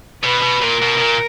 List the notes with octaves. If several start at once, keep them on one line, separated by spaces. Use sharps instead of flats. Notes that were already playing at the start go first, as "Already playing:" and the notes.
B2 B4
B2
A#2 A#4
B2
B2
A#2